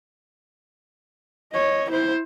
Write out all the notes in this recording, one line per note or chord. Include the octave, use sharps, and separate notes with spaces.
C#5 D#5
E4 C5